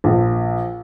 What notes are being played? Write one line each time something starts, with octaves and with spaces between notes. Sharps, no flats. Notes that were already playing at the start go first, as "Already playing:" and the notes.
A#1